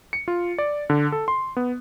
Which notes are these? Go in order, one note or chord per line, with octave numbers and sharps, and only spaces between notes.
C#7
F4
D5
D3
A4
C6
B3